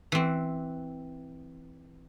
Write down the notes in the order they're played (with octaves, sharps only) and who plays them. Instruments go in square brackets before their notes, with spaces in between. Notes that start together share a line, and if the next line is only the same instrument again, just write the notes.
[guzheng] E3 C4